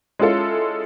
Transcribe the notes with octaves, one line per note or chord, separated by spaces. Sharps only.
G#3 C#4 E4 F4 A4